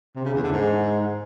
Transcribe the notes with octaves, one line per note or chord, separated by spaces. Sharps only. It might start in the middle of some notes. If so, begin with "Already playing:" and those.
C3
C#3
E2
D3
G#2